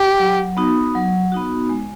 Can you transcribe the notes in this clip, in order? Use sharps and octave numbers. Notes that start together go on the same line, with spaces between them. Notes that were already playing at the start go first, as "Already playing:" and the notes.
Already playing: G4
F#3
B3 D#4 F#4
F#3
B3 D#4 F#4
G#3